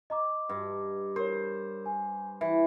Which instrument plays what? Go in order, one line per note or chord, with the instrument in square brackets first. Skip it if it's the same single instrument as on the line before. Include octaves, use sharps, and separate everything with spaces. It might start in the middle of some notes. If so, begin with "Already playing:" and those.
[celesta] D#5 A#5 D6
[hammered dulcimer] G2
[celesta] A#4 C#5 [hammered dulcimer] C5
[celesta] G#5
[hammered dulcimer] E3 [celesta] E5